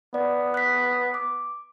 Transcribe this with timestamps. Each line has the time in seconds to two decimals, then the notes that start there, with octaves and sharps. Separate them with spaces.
0.14 B3 D5
0.54 F#6 B6
1.14 D6